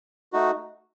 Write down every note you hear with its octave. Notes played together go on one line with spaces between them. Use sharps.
A3 D#4 F#4